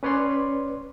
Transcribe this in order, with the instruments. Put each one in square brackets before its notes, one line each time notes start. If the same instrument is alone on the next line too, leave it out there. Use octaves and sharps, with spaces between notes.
[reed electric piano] C#4 B4 C#5 D5 C6